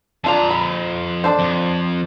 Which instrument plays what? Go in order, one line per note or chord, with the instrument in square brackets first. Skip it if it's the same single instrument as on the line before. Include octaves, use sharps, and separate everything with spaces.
[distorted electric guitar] F2 A#5 [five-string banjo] D4 F4 A4
[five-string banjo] B5
D4 A4 C5
[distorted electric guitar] F2